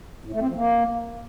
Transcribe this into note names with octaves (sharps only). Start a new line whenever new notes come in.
A2
A3
C4
F3
A#3